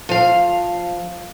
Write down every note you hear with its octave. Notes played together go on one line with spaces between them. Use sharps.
F3 F5